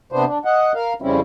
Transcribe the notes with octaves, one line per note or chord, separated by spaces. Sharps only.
C3 B3 D4 C5
D4
D#5 F#5
A#4 F5
F2 C#3 G3 C4 C#4 E4